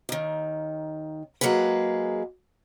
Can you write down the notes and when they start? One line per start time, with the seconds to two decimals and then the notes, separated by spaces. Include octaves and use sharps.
0.09 D#2 D#3
1.41 F#3 G#3 A#3 G#4 B4